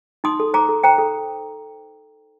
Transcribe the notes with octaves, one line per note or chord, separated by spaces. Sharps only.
D#4 C6 D#6
A4
C5 A#5 D6
A4
C5 G5 A#5
A4